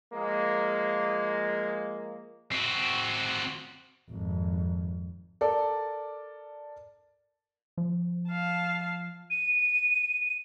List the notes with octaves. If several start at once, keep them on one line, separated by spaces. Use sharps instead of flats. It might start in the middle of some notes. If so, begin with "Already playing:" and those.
F3 G#3 A#3
C4 F#4
G#1 F2
A4 A#4 D5
F3
F5 A5
D#7